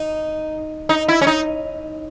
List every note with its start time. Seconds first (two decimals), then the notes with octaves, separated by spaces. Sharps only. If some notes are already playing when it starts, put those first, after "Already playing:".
Already playing: D#4
0.89 D#4
1.08 E4
1.21 C#4
1.27 D#4